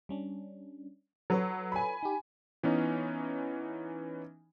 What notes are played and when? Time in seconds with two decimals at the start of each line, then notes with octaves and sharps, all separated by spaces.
0.09 G3 C#4 D4
1.30 F#3 A4 B4 C#5
1.72 G#5 B5
2.03 D#4 G4
2.63 E3 B3 C#4 D#4